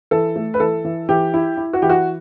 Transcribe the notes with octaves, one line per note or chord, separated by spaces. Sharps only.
E3 A4
A3
B4
E3 A4
E3
E3 G4
E4
E4
F#4
E3 G4
F#4